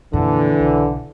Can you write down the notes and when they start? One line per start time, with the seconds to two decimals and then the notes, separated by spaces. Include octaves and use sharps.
0.13 F2 A#2 D3 E3
0.56 B1 C#3